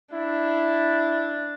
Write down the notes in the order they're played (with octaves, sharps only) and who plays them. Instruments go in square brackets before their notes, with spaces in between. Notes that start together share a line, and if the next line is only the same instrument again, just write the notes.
[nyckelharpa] D4 [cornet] E4